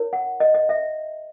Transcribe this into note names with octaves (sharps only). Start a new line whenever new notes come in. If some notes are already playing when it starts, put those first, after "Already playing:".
Already playing: E4 A#4 C#5
F#5
D#5
D#5
E5